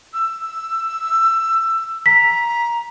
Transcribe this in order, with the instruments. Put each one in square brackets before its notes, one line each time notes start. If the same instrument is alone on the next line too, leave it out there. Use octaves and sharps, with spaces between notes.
[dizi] E6
[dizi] A#5 [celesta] B6